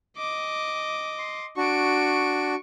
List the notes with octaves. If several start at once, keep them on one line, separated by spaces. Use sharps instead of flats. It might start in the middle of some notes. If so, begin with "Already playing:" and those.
D#5 D6
C6
D4 F#4 C#6 D7